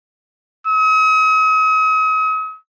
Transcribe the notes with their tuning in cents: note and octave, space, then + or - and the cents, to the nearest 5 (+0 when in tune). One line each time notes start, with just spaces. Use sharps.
D#6 +40